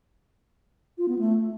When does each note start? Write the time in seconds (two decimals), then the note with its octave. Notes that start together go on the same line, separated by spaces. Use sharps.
0.98 F4
1.08 B3
1.19 A3